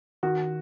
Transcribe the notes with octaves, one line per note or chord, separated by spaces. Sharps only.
D#3 F#4